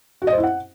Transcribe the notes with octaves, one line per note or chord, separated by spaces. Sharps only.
F#4
D#5
C5
E4
F#5